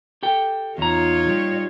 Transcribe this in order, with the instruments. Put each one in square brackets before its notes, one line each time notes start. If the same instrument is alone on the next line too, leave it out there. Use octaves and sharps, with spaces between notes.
[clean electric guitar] G4 A4 G5
[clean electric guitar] E2 A#5 [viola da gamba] D#4 F4 C#5
[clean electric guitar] G3